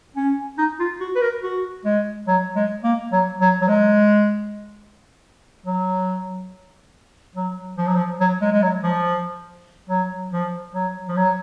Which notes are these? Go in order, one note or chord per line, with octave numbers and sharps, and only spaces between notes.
C#4
D#4
F4
F#4
B4
A#4
F#4
G#3
F#3
G#3
A#3
F#3
F#3
F#3
G#3
F#3
F#3
F3
F#3
F3
F#3
G#3
G#3
F#3
F3
F#3
F3
F#3
F3
F#3